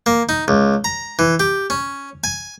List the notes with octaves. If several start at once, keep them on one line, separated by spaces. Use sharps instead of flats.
A#3
D#4
C#2
A#5
E3
G4
C#4
G#5